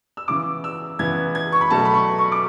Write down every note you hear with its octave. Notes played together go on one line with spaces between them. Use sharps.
E6
C#3 E3 B3 D6
E6
C#3 E3 B3 G#6
G#6
C#6
B5
B2 F#3 A3 A5
B5
C#6
C#6
D6